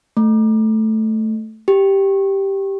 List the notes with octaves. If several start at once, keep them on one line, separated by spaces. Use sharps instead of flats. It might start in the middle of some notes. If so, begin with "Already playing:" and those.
A3
G4